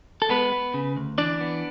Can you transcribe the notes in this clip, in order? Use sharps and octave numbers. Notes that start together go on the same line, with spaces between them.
A4
G#3 B3 B4
B3
C#3
D2
E3 D4 D5
B3